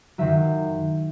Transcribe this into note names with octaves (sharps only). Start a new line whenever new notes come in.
F#2 D#3 F#3 E5